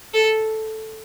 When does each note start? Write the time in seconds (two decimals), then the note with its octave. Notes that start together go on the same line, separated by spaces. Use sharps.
0.14 A4